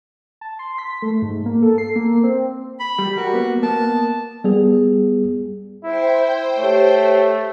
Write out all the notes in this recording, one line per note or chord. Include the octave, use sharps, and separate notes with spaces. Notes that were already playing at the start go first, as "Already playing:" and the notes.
A5
C6
B6
A3
G#2
A#3
A4
C7
A#3
C4
B5
G3
G3 F#4 G4 A#4
A#3 B3
A#3 B3 A5
G3 B3 G#4
E4 C5 G5
A3 G4 C#5